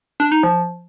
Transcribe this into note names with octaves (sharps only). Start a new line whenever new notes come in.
D4
D#4
F3